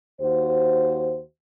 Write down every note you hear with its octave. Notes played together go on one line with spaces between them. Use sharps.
D#2 F#4 C5